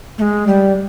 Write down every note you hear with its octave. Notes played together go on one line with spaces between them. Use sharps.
A3
G#3
G3